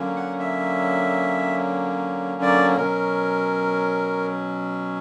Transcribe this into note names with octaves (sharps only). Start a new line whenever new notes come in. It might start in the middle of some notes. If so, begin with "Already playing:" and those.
Already playing: D3 F#3 A#3 C#4
F#5
E5
D5
B2 F#3 C#4 A#4